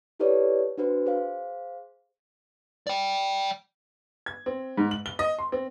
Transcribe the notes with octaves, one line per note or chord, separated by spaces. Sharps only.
E4 G4 A4 B4 C#5 D5
D4 F#4 B4 C5
G#4 C5 F5
D5 G5
G#6
C4
G#2
F#7
G7
D#5
C6
C4